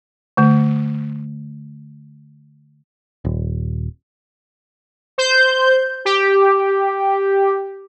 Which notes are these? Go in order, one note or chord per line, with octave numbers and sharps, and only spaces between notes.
D3 A3
D#1
C5 G6
G4